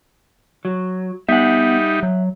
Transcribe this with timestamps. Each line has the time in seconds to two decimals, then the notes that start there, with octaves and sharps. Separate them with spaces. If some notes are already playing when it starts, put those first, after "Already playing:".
0.65 F#3
1.29 G3 B3 D#4 E5 F#5
2.03 F#3